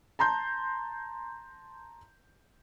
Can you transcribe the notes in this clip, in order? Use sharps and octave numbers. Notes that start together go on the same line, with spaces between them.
A5 A#5 C6 G6